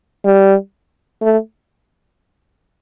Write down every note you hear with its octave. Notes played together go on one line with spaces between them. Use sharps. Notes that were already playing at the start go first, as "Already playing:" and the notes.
G3
A3